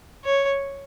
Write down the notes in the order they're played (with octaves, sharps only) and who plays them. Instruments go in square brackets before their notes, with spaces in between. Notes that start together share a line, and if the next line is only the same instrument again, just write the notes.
[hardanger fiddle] C#5